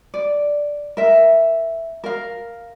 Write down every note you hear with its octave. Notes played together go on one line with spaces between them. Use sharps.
D5
A#4 E5
A#4 F5